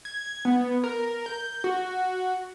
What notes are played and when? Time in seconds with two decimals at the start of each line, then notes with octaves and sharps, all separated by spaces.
0.05 G#6
0.45 B3
0.84 A#4
1.26 G6
1.64 F#4